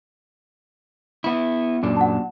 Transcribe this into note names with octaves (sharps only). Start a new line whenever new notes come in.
B3 E4
F#2 A#2 D4
F#5 A5